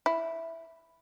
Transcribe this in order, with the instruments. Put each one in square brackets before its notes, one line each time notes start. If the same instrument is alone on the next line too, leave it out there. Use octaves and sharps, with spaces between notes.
[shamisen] E4